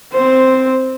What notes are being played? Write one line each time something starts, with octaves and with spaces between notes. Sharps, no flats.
C4 C5